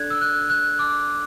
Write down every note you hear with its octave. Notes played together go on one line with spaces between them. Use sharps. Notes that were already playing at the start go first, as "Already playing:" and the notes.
Already playing: D4 A4 D5 F#6 G#6
E6
F#6
F#6
D6